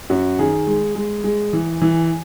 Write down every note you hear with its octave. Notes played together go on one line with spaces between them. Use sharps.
F#2 F#4
D#3 G#4
G#3
G#3
G#3
E3
E3